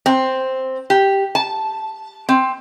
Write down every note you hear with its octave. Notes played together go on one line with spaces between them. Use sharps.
C4
G4
A5
C4